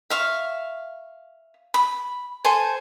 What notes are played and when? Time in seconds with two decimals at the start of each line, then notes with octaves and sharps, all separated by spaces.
0.10 E5 F5 C#6
1.74 B5
2.44 A4 C5 G#5